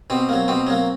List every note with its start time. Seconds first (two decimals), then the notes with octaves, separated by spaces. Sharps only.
0.10 B2 C4
0.29 F#3 A#3
0.48 B2 C4
0.67 F#3 A#3